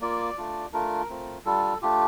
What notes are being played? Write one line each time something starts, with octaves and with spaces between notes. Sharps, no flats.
A#3 F4 D5
A3 D4 F4
A3 D4 F4 A#4
A3 C4 F4
G3 D4 F4 A4
A3 D4 F4 G4